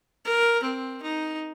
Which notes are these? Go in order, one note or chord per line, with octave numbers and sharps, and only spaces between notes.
A#4
C4
D#4